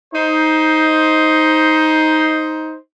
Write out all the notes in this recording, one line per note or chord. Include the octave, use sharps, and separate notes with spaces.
D#4 C5